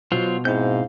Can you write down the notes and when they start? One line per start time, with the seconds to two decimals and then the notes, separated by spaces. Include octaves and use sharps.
0.12 B2 F#3 F4 C5
0.45 G#2 C4 E4 F5 G6